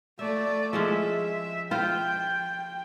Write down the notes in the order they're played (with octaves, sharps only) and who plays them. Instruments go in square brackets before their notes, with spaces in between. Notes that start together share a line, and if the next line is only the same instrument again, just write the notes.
[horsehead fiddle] A3 D5 [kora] E5
[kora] F3 G#3 C#4 [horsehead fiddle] E5
[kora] F4 C5 [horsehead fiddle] G5